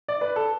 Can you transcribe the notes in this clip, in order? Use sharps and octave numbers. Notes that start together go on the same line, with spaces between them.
D5
B4
A4